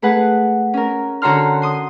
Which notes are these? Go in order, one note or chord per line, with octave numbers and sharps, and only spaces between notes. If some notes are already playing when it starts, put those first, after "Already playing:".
A3 G#4 B4 F#5
C#4 A#4
D3 F#4 C#5 A#5 C6 F6
C6 D#6